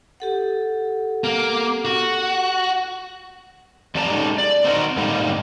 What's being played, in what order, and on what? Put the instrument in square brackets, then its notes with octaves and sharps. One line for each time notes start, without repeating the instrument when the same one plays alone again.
[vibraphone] G4 A4 F#5
[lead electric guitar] A#3
F#4
[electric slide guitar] F2 A3 G4 D5 A5 A#5
G#3 A3 C#4 D#4 G4 A4
D5
C4 D#4 F#4 A#4
G#2 D3 G3 A#3 D#4